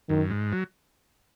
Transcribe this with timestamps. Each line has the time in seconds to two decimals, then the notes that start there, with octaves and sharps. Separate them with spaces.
0.09 F#2 D#3
0.30 G#2
0.52 F#3